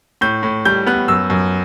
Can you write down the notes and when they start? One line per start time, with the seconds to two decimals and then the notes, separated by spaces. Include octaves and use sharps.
0.21 A2 G6
0.43 A2
0.65 G3 G6
0.87 B3 F#6
1.08 F#2 E6
1.30 F#2